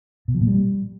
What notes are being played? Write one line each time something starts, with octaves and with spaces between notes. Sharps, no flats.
B2
F3
A#2
G3